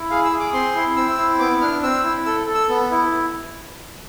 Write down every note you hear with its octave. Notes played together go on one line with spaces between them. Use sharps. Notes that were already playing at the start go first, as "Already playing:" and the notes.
Already playing: E4
G#4 F5
E6
G#4
D6
C4 C6
E4
C4 E6
E4
B3 D6
D4 F6
C4 E6
E4
A4 E6
A4
E6
B3
E4